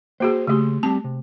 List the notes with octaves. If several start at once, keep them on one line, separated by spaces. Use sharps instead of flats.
A#3 F#4 G#4 C5
C#3 A3 G4 E5 C6
G3 C4 A5
C3